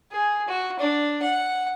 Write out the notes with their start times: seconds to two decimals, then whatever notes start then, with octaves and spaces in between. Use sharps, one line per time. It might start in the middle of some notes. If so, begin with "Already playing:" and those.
0.12 G#4
0.48 F#4
0.79 D4
1.22 F#5